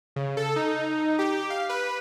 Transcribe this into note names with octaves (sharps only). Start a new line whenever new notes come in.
C#3
A4
D#4
G4
F5
B4